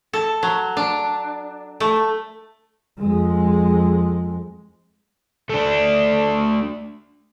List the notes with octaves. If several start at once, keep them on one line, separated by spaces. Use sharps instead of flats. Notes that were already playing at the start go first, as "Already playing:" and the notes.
A4
F#3
D4
A3
F2 G#3
A3 D4